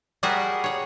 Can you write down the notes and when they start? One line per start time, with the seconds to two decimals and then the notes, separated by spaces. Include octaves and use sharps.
0.23 G3 F#4 G#4 A#4 F#5
0.64 G#4 C#5